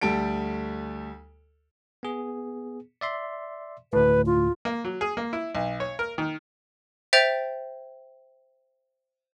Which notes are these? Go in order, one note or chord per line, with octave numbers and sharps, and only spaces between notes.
D2 G3 A4 D7
B3 G#4
D5 E5 C6
D2 A2 B4
F4
A#3
F#3
G#4
A#3
E4
B1
C#5
A#4
D#3
C5 E5 G5 G6 A6 F7